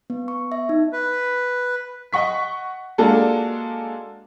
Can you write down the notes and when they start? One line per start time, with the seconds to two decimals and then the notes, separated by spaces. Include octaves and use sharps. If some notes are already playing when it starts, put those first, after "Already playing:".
0.10 B3
0.28 C#6
0.52 E5
0.69 D#4
0.92 B4
2.13 D#5 F#5 C#6 B6
2.98 G#3 A#3 D4 F4 F#4 A4